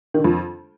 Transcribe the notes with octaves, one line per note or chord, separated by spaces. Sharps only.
D#3
D3
F2